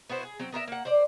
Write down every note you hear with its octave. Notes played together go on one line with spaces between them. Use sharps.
B3 E4 F#4 C5
G#4
F#3 C4
B3 A#4 C5 E5
A#3 F#5
C5 D5